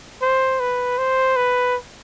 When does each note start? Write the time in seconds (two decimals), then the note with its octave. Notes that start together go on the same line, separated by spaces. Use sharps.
0.22 C5
0.60 B4
0.98 C5
1.36 B4